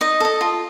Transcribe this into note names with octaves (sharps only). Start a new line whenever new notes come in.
D#4 D#5
A4 D#5
F4